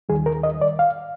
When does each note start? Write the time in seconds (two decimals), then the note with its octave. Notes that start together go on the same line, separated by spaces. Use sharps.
0.09 D#2 D#3 G3 G#4
0.26 A#4
0.43 D#5
0.61 D5
0.79 F5